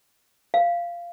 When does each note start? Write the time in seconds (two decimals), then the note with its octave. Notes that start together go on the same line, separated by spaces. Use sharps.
0.54 F5